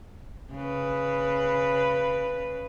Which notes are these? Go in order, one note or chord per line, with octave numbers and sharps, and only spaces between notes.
C#3 B4